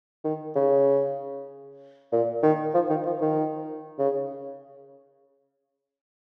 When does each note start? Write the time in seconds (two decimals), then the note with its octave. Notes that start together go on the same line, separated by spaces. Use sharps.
0.24 D#3
0.55 C#3
2.12 A#2
2.43 D#3
2.74 F3
2.90 D#3
3.06 F3
3.21 D#3
3.99 C#3